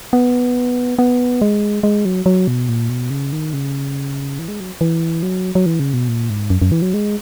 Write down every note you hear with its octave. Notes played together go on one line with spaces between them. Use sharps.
B3
B3
G#3
G#3
F#3
F#3
B2
A#2
B2
C#3
D#3
C#3
E3
G#3
F#3
E3
F#3
F#3
E3
C#3
B2
A#2
G#2
F#2
F#2
E3
F#3
G#3